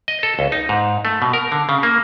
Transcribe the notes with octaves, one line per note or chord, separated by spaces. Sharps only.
D#5
A4
C#2
D#4
G#2
A3
B2
A#4
D3
C#3
A#3